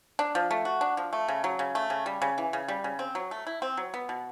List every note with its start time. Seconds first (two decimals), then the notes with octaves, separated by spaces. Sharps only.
0.19 D4
0.35 F3
0.51 A3
0.65 F#4
0.81 D4
0.97 F3
1.13 A3
1.28 C#3
1.44 F#3
1.59 C#3
1.75 A3
1.90 C#3
2.06 G3
2.22 C#3
2.38 E3
2.53 C#3
2.68 G3
2.84 C#3
2.99 C4
3.15 F#3
3.31 A3
3.47 E4
3.62 C4
3.77 F#3
3.94 B3
4.09 B2